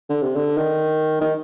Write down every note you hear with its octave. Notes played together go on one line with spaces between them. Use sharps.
D3
C3
D3
D#3
D#3